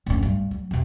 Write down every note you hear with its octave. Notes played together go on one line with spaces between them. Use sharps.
D1 F#2
G2
F#3
F1 C3